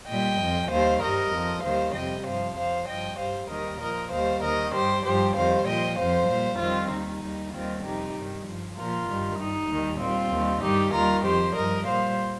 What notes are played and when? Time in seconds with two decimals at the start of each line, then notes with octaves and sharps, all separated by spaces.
0.08 A#2 G3 D#5 G5
0.40 F2 F3
0.70 D#2 D#3 G3 C5 F5
1.01 G2 G3 A#4 D#5
1.32 F2 F3
1.63 D#2 D#3 G3 C5 F5
1.95 F2 C3 G3 D#5 G5
2.26 G2 F3 C5 F5
2.56 F2 F3 C5 F5
2.87 G2 F3 D#5 G5
3.18 G2 G3 C5 F5
3.50 D#2 D#3 G3 A#4 D#5
3.80 A#2 F3 A#4 D#5
4.12 D#2 D#3 G3 C5 F5
4.43 D#2 D#3 G3 A#4 D#5
4.73 G2 G3 G4 C5
5.05 G2 F3 G4 C5
5.35 F2 D#3 G3 C5 F5
5.67 A#2 F3 D#5 G5
5.97 F2 F3 C5 F5
6.29 A#2 G3
6.59 F2 D#3 G3 C4 F4
6.91 D#2 D#3 G3 D#4
7.22 D#2 D#3 G3
7.53 D#2 D#3 G3 C4 F4
7.84 F2 C3 D#3 G3 D#4 G4
8.14 G2 D#3 G3
8.46 G2 F3
8.77 A#2 F3 F4 A#4
9.08 G2 D#3 G3
9.39 G2 G3 D#4
9.70 D#2 D#3 G3
10.00 A#2 G3 C4 F4
10.32 D#2 D#3 G3
10.63 G2 D#3 G3 D#4 G4
10.94 D#2 D#3 G3 F4 A#4
11.24 F2 F3 G4 C5
11.56 G2 F3 A#4 D#5
11.87 A#2 G3 C5 F5